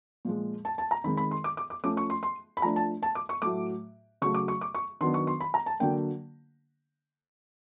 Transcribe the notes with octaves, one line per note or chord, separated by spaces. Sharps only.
A#2 F3 G#3
A5
A5
A#5
D#3 G#3 C4 B5
B5
C6
D6
D6
D6
F3 A3 C#4 D6
C#6
C6
C6
B5
F3 A3 D4 A#5
A5
A5
D6
C#6
A2 F#3 A3 D6
C#3 F#3 A3 C#6
D6
C#6
D6
C#6
D#3 F#3 B3 D4 C6
C#6
C6
B5
A#5
A5
D3 F#3 A#3 D4 G5